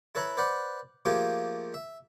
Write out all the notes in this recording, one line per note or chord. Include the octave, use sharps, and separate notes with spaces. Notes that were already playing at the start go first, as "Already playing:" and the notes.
E4 A4 B4 C#5 A#5 B5
B4 C5 D5 F#5 B5
F3 A3 A#3 F4 G4 G#4
E5